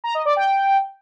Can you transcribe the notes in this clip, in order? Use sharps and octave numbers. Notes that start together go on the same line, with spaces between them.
A#5
D#5
D5
G5